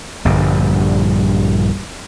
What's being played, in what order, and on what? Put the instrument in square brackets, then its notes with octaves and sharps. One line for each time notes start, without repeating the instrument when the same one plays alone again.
[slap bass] A#1 G2 D3 G3